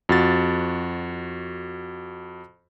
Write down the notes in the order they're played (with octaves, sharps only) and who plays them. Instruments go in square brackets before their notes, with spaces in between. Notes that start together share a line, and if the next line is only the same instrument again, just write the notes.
[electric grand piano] F2 F#4 A6